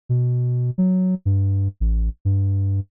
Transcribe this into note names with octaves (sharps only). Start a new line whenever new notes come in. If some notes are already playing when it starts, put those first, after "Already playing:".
B2
F#3
G2
A1
G2